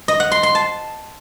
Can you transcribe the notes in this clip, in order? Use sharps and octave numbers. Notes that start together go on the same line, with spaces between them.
D#5
F#5
C6
C6
A5